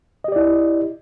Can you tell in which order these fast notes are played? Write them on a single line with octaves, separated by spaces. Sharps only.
D#5 G4 D5 E4